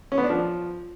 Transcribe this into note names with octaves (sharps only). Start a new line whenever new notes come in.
C#4
B3
D4
F3